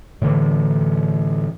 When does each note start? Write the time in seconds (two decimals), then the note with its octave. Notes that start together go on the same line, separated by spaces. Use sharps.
0.22 A2 D3 E3